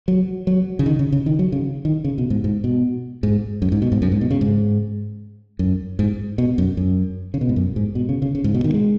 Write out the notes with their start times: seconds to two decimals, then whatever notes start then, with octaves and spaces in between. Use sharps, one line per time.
0.08 F#3
0.47 F#3
0.79 C#3
0.86 D#3
0.99 C#3
1.12 C#3
1.26 D#3
1.39 F#3
1.52 C#3
1.85 D#3
2.04 C#3
2.18 B2
2.30 G#2
2.44 G#2
2.64 B2
3.23 G#2
3.62 F#2
3.72 G#2
3.82 B2
3.92 G#2
4.02 F#2
4.12 G#2
4.21 B2
4.31 C#3
4.41 G#2
5.59 F#2
5.99 G#2
6.38 B2
6.58 F#2
6.77 F#2
7.34 C#3
7.41 B2
7.49 G#2
7.56 F#2
7.76 G#2
7.95 B2
8.09 C#3
8.22 C#3
8.35 C#3
8.44 G#2
8.55 B2
8.64 D#3
8.74 G#3